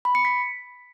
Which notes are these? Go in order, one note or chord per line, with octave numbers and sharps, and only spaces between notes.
B5
C#7
B6